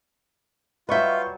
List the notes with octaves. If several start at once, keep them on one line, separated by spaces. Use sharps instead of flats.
F#3 G3 F4 B4 D#5 E5 C#6 G6